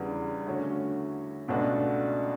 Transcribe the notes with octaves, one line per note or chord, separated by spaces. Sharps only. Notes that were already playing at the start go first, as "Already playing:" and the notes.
Already playing: E2 C#3 G3 B3 D4
D3 A3 C#4 F#4
C#2 B2 A3 D4 F#4